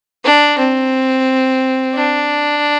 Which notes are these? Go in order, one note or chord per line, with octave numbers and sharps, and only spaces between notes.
D4
C4
D4